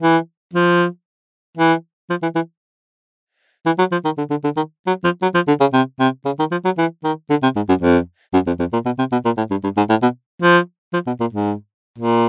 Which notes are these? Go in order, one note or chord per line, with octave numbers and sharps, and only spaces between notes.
E3
F3
E3
F3
E3
E3
E3
F#3
F3
D#3
D3
D3
D3
D#3
F#3
F3
F#3
F3
D3
C#3
C3
C3
C#3
D#3
F3
F#3
E3
D#3
D3
C3
G#2
F#2
F2
F#2
F2
F2
A#2
B2
C3
B2
A#2
A2
G2
G2
G#2
A2
B2
F3
F3
B2
A#2
G#2
A#2